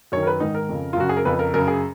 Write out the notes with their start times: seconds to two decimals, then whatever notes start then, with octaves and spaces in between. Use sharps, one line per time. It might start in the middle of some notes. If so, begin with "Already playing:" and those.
0.12 F#2 D#3 C#5
0.23 A#4
0.27 B4
0.40 G#2 D#3 D#4
0.55 A#4
0.69 F2 C#3
0.93 F4
0.97 F#2 C#3 F#4
1.09 G#4
1.17 A#4
1.25 F2 C#3 B4
1.39 A#4
1.54 F#2 C#3 A#4
1.68 G#4